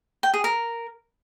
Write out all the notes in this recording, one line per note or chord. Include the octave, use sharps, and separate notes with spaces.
G5
G#4
A#4